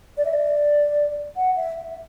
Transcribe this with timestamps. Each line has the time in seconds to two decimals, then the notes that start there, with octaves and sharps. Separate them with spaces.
0.17 D5
0.25 E5
0.33 D5
1.37 F#5
1.56 E5